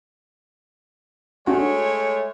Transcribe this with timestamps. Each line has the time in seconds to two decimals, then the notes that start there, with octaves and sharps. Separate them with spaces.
1.47 G#3 A3 D4 F#4 C#5